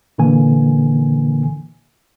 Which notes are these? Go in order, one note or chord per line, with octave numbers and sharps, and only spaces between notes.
A#2 D3 E3 A#3 G#5